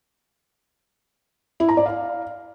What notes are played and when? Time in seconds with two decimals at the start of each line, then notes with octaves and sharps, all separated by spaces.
1.60 E4
1.69 A#5
1.77 D5
1.86 F5